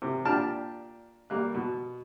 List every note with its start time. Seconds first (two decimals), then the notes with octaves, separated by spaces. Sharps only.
0.02 C3
0.25 A#2 D4 G4 G5 A5 F6
1.30 G3 A#3 F#6
1.55 B2